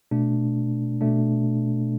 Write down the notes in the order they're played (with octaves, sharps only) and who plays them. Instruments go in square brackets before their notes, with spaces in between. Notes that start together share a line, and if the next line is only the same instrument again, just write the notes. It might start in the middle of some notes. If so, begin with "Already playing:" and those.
[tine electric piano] B2 A3 D4
B2 A3 D4